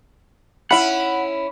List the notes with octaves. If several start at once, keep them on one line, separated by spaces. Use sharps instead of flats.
C#4 E4 F#5 B5